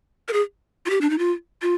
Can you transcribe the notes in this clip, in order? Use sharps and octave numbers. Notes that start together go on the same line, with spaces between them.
A#4
G#4
F4
G4
D4
D#4
F4
F4